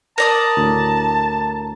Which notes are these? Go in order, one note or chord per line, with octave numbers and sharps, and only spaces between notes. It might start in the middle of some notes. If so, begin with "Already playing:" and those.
A#4 D5 A5 D#6
D2 A2